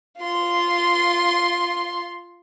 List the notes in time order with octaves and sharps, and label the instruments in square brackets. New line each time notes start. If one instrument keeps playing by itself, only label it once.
[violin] F4 C6